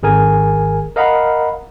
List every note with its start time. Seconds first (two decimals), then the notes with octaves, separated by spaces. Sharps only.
0.03 G#1 G#4 A#4 G#5
0.96 A#4 D#5 F5 F#5 A#5 B5